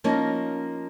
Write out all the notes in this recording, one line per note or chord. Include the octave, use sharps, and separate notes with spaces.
F3 A#3 C#4 D#4